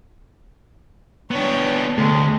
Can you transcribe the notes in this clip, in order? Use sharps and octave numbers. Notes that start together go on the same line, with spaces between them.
B3 D4 C#5 G5
D2 G#3 A3